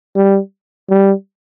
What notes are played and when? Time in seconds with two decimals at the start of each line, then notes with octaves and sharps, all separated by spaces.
0.16 G3
0.90 G3